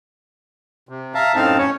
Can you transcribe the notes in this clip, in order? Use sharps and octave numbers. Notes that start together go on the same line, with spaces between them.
C3
E5 F5 A5 A#5
F#2 A2 C4 D#4 F5 A5
C#4 C#5